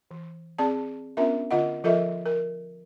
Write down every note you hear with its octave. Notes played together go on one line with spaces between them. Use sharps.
E3
C4 G#4 D5 A5
B3 C#4 D4 F4 A#4 E5
D3 F4 D#5 F#5
F3 F4 A4 A#4 D#5 E5
A#4